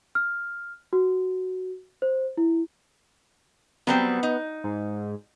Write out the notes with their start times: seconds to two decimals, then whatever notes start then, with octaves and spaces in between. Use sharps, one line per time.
0.15 F6
0.93 F#4
2.02 C5
2.37 E4
3.87 F#3 G3 B3 C4
4.23 D#4
4.64 G#2